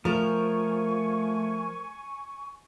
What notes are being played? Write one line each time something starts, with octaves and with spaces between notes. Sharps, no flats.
F3 A3 A#4 G#5 C#6